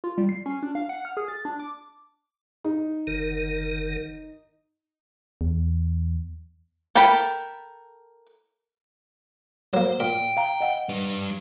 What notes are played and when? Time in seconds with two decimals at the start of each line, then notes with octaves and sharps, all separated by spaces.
0.04 F4
0.18 G3
0.29 C7
0.46 C#4
0.63 D4
0.75 F5
0.89 F#5
1.05 F6
1.17 G#4
1.28 A6
1.45 D4
1.59 D6
2.64 D#4
3.07 F#1 D#3 A#4
5.41 E2
6.95 A4 A#4 G5 A5 B5
9.74 F#3 A#3 C5
10.00 A#2 G5
10.37 F5 A#5
10.61 D#5 F#5
10.89 G3 B4